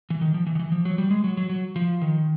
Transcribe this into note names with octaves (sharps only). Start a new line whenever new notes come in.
E3
D#3
F3
E3
D#3
E3
F3
F#3
G3
G#3
F#3
F#3
F#3
F3
D#3